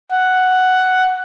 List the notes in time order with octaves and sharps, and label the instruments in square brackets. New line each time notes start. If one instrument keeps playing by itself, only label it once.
[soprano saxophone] F#5